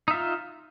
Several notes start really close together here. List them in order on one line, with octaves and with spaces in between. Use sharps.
D#4 E5 F4